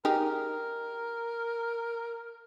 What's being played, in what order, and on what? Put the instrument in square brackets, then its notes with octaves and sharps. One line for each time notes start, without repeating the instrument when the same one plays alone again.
[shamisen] D#4 G4 G#4 [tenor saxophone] A#4